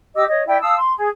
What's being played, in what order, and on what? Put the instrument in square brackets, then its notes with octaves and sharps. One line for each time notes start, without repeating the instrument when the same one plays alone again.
[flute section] G4 D#5 D6 E6
C#5 D#5
E4 D5 E5 G5
F5 A5 D#6 E6
C6
G#4